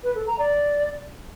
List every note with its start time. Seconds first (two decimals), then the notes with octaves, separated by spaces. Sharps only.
0.04 B4
0.15 A4
0.27 A#5
0.39 D5